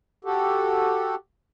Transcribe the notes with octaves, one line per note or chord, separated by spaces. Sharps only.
F#4 G4 A4